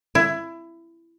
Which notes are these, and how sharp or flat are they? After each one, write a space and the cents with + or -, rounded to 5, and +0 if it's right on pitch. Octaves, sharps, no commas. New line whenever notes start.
E4 +20